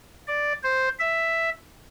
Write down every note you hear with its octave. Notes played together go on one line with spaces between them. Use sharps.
D5
C5
E5